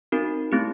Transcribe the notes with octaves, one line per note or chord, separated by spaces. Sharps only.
C4 D#4 F#4 A#4
A3 C4 E4 G4